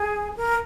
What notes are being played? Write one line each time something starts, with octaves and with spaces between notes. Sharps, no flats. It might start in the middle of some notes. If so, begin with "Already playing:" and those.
Already playing: G#4
A#4